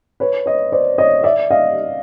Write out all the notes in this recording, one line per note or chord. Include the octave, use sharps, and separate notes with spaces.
B4 C#5
C#5 D#5
C5 D5
C#5 D#5
D5 E5
D#5 F5